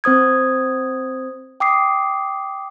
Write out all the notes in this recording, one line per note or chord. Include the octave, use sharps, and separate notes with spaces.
C4 C5 D#6 G#6
G5 D6 D#6 C7